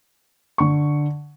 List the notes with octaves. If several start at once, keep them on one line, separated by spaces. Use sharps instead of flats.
D3 C#6